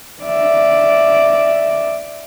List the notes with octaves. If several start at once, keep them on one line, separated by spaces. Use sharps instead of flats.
D5 E5